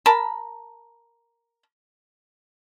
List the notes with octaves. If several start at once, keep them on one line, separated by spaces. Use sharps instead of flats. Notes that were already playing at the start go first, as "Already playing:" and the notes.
A#4 A5 B5